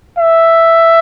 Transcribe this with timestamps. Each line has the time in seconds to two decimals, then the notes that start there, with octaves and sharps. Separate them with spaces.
0.18 E5